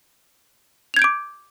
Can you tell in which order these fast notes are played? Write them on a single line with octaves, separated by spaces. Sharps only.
F7 G#6 G6 D7 D6